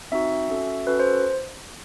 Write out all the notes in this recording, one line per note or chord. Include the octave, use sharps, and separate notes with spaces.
C4 D#4 F#4 E5
C#4 F#4 A4
C#4 F#4 A4 B4
C5